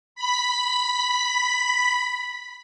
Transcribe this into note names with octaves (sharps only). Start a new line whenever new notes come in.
B5 B6